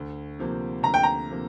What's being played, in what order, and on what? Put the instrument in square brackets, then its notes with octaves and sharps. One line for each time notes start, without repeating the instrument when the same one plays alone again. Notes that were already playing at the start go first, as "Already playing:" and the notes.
Already playing: [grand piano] D2
C3 F3 A#3
[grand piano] D2 [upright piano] A#5
[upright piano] G5
A#5
[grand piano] C3 F3 A#3